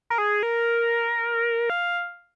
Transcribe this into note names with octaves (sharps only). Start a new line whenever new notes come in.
A#4
G#4
A#4
F5